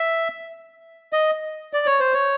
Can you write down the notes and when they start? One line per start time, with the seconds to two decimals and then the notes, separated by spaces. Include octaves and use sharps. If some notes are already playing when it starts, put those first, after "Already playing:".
Already playing: E5
1.13 D#5
1.73 D5
1.86 C#5
2.00 C5
2.14 C#5